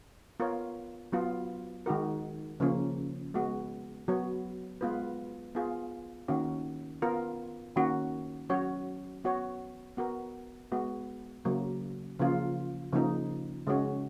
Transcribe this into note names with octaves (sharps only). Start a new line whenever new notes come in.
B3 F4 A#4 C#5
F#3 B3 F4
D#3 G#3 D#4 F#4 A#4
C#3 F3 A#3 C#4
G#3 B3 F#4
F#3 B3 F#4 C#5
G#3 B3 F4 B4
B3 F4 G#4
D#3 A#3 C#4 F#4
B3 F4 A#4
D#3 A#3 C#4 F#4
F#3 C#4 F#4 C#5
B3 F#4 C#5
B3 F#4 A#4
G#3 B3 F#4
C#3 F#3 A#3
C#3 F3 A#3 F4
C#3 F3 A#3 D#4
C#3 G#3 C#4 F#4 C#5